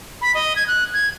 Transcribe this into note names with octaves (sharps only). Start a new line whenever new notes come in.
B5
D#5
G#6
F#6
G#6